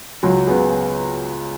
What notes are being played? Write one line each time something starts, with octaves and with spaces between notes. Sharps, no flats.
C#2 F#3
C#3 B3 G#4